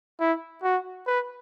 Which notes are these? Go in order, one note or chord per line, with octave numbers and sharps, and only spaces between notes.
E4
F#4
B4